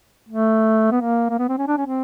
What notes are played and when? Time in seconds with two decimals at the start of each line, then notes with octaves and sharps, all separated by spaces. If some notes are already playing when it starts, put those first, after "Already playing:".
0.29 A3
0.91 B3
1.01 A#3
1.29 A#3
1.39 B3
1.48 C4
1.58 C#4
1.67 D4
1.77 C#4
1.86 C4